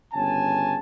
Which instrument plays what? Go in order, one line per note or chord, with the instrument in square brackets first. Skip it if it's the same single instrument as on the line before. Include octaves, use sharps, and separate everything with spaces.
[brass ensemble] G1 C#3 C#4 G#5 A5